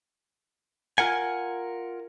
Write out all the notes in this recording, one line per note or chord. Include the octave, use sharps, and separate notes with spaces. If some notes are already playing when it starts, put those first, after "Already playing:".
F4 A#4 F#5 G#5